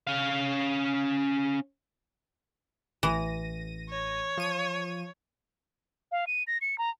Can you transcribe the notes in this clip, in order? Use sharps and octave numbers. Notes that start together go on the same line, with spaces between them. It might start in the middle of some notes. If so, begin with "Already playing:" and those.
C#4 F5
A1 E3 A#6 D#7
C#5
F3 D#7
F5
D#7
A#6
C#7
A#5